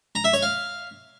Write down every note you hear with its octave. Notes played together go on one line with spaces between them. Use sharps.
A#5
E5
C#5
F5